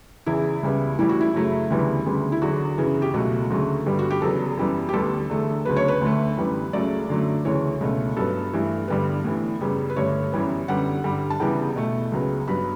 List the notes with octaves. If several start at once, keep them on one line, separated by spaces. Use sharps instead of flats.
E2 C#3 E3 E4
C#2 C#3 G3 B3
A2 E3 G3 E4
F#4
E4
F#2 C#3 F#3 A3
D2 C#3 E3 G3 B3
D2 C#3 G3 B3
E4
E2 D3 F#3 F#4
F#2 C#3 E3 B3
G4
C#2 B2 F#3 A3 F#4
D2 C#3 F#3 A3
G2 D3 G3 B3
F#4
G4
E2 C#3 F#3 B3 A4
F#2 E3 G3 B3
G4
D2 D3 G3 B3 A4
E2 D3 A3
D2 C#3 F#3 B3 B4
C#5
B4
D2 D3 A3
F#2 E3 G3 B3
C#2 C#3 F#3 A3 D5
F#2 D3 F#3 A3
D2 C#3 E3 C#5
C#2 B2 A3
G2 F#3 B3 A4
G2 E3 A3
G2 D3 G3 B3
A2 E3 B3
F#2 C#3 G3 B3
B4
G2 D3 A3 C#5
F#2 E3 G3 B3
F#2 D3 G3 B3 F#5
G2 D3 G3
A5
E2 C#3 E3 G3 B3 G5
B2 A3
C#2 C#3 F#3 B3
G2 F#3 B3 B5